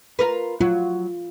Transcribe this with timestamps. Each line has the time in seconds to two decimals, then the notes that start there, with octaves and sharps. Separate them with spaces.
0.19 F4 A#4 B4
0.61 F#3 F4